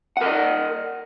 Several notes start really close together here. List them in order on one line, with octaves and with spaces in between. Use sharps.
F#5 A#4 D#5